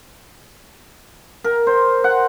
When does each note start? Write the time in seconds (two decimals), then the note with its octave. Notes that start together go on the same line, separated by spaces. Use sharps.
1.44 A#4
1.67 C5
2.04 F#5